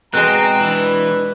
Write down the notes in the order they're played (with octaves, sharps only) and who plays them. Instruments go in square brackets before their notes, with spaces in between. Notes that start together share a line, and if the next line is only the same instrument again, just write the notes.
[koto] B2 G#3 [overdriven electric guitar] C4 [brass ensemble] F#5 G#5 A#5 [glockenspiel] F#6
[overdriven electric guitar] E3 [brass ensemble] D4 B4